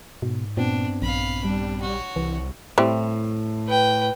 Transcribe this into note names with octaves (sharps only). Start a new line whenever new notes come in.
G#2 B2
G2 A#2 B3 C4 D4
A#1 F5 B5
G3 D4
F#4 C#5
C2 E3
A2 E3 G3 C4
B4 G5